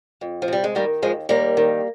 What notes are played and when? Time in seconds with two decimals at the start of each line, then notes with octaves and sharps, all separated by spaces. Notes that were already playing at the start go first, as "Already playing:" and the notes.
0.21 F2
0.42 F3
0.48 C3 G3
0.64 G#3
0.75 D#3 G3 A#3
1.02 D#2 F3 G#3
1.29 D#2 G3 A#3
1.57 D#3